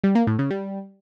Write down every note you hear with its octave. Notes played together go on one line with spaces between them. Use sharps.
G3
A#3
A2
C#3
G3